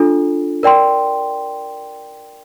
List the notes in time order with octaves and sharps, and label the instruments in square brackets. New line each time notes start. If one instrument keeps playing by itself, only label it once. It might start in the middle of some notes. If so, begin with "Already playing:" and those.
Already playing: [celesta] D4 F4 A4
A#4 D5 G5 C6